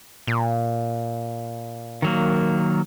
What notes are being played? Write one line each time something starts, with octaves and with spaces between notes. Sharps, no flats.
A#2
D#3 F#3 A#3